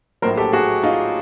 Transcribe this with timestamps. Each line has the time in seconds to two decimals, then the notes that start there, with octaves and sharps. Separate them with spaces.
0.22 A#1 A2 F#3 A#4 C5
0.37 G4 A4
0.52 F#4 G#4
0.83 D#4 F4